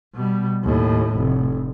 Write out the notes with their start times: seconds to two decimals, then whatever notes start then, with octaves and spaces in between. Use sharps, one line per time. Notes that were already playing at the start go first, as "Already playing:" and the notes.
0.14 B2 G3
0.63 D#2 A2
1.16 F1